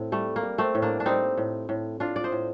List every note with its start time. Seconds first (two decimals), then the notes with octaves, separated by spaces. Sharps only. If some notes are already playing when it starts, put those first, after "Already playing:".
Already playing: A2 C4
0.12 G3 A3
0.36 A#3
0.43 G3
0.58 A3 C4
0.75 A2
0.82 A#3 D4
1.00 D4
1.06 G3 C4 D#4
1.38 A2
1.69 A2
2.00 A2 D4 F4
2.16 D5
2.24 C5 D#5
2.32 A2